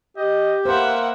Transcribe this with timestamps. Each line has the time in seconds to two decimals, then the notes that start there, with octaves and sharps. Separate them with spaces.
0.17 G4 D#5
0.66 A#3 B4 C5 E5 F#5